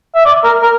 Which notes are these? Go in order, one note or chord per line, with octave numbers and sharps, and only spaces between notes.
E5
D5
A#4
A#4